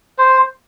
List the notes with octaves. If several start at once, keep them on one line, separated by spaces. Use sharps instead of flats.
C5